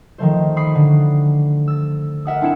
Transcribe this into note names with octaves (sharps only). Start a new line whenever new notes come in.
D#3 F3 A3 C5
B5 C#6 D#6 C7 C#7
D3
E6 A6
A#4 E5 F#5 D#6
C4 D4 E4 C#7 E7